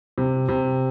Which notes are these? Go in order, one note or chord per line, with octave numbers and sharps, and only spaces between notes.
C3
C3